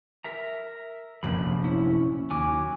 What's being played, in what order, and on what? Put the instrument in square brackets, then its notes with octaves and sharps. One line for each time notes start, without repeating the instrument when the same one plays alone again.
[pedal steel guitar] A#4 E5 A#5
[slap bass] F1 A#1 F#2 [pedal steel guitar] B5
[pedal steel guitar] C#4 E4
[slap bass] D#2 [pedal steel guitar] F#3 G#5 D6